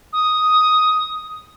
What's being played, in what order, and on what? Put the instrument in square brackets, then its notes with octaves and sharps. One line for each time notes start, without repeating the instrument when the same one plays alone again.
[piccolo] D#6